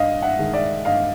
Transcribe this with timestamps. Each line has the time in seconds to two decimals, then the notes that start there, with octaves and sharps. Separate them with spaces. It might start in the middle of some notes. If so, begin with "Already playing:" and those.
Already playing: G2 D#5 F5
0.22 E5 F#5
0.39 D#3 G#3
0.53 D5 E5
0.85 G2 D#5 F5